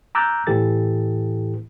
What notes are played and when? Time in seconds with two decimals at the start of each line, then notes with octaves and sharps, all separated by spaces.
0.15 A#5 D6 E6 F#6 G6 A6
0.47 A2 E3 G4 A4 A6